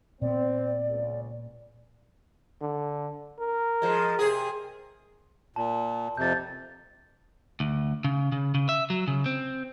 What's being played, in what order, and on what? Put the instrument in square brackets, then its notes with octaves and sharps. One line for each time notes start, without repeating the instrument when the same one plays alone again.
[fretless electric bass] A#2 B3 [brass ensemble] C4 [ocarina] D5
[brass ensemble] C#2
[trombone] D3
A#4
[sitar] F3 G#3
C3 G#4
[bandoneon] A#2 [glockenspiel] A5
[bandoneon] F2 C3 [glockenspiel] G6 A6
[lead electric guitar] D2
C#3
C#3
C#3
E5
F#3
C#3
C4